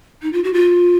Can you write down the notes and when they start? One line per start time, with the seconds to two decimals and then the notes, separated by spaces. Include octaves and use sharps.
0.22 D#4
0.33 F4
0.44 F#4
0.54 F4